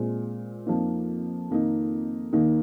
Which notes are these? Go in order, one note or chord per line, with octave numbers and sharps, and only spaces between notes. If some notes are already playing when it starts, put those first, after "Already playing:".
Already playing: A#2 G#3 C4
F2 F3 A#3 D#4
F2 D#3 A#3 D#4
D#2 D#3 A#3 D#4